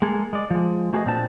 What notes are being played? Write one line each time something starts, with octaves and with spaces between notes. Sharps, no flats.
G#3 A#3 G#4 A4
G#3 D5
F3 G#3
A3 F#4 G#4 B4 C5 D#5
A#2 C4 D4 A5